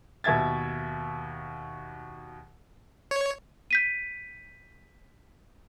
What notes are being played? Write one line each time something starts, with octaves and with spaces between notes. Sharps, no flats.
D#2 B2 E5 G#6 A6
C#5
G6 B6 D#7